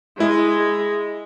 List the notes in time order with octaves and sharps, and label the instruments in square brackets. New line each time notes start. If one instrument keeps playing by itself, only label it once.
[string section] G#3 [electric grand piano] E4